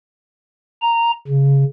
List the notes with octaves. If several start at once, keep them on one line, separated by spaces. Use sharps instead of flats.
A#5
C#3